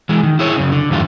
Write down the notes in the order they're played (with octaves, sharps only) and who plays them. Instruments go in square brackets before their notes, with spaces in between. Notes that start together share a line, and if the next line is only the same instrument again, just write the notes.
[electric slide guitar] E3 G#3
D#3
E4 G#4 C#5
F#2 C#3
D3
E2 G2 A3 F4